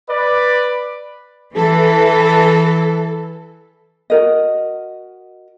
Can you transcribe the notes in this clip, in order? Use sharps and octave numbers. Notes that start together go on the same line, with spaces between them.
B4 D5
E3 A4
F#4 A#4 D#5